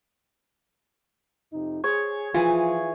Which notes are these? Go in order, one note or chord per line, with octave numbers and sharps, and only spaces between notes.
F2 C3 D#4
G#4 C#5
E3 F3 F4 G#4